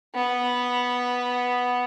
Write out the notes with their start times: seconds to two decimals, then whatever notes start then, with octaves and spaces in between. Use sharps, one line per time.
0.15 B3